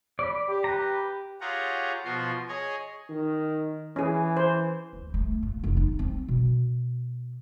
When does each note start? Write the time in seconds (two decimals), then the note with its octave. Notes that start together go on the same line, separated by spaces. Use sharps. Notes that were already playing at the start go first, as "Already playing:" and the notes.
0.19 D5 B5
0.49 G4
0.64 B4 A#5
1.41 F4 G4 G#4 C#5 F#5 A#5
2.05 B2 F3 F4 F#4 C6
2.48 G#4 C#5 D#5 G#5
3.09 D#3
3.96 E3 C#4 G#4
4.37 C5
4.93 D2
5.14 A3
5.43 A#2
5.64 F1
5.77 D#4
5.99 C4
6.28 B2